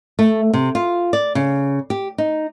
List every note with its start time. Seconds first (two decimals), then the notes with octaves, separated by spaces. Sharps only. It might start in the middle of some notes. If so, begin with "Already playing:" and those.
0.19 A3
0.53 C3
0.75 F4
1.13 D5
1.35 C#3
1.90 G4
2.18 D#4